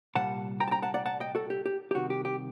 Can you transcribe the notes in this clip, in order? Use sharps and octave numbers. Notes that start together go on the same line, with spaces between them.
C2 A#2 G3 F#5 A5
G5 A#5
A5
G5 A#5
F#5 A5
D5 F#5
F#5 A5
D#5 G5
F#4 A4
G4
G4
G4
C2 C3 D#3 F#4
G4
G4